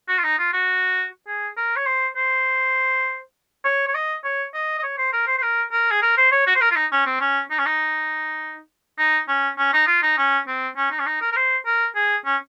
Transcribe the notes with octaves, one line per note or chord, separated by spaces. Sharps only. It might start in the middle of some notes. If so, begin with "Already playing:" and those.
F#4
F4
D#4
F4
F#4
G#4
A#4
C#5
C5
C5
C#5
C#5
D#5
C#5
D#5
D#5
C#5
C5
A#4
C5
C5
A#4
A#4
G#4
A#4
C5
C#5
F#4
C5
A#4
F4
D#4
C#4
C4
C#4
D#4
C#4
D#4
D#4
C#4
C#4
D#4
F4
D#4
C#4
C4
C#4
D#4
C#4
D#4
A#4
A#4
C5
A#4
G#4
C#4